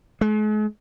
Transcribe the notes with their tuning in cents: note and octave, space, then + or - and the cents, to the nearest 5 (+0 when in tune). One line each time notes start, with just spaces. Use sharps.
G#3 +45